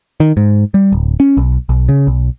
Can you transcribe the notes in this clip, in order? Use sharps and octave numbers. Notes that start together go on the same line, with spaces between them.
D#3
G#2
G3
D1
C#4
B1
B1
C#3
B1